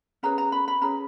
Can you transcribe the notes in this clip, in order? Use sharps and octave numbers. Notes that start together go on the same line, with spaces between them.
C#4 G#4 B4 A#5
A#5
B5
B5
C#4 G#4 B4 A#5